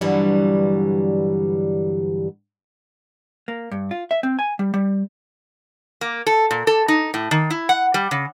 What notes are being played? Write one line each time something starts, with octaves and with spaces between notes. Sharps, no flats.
G2 D3 E3 F#3 G3
A#3
G2
F4
E5
C4
G#5
G3
G3
A#3
A4
A#2
A4
D#4
A2
D#3
E4
F#5
G3
C#3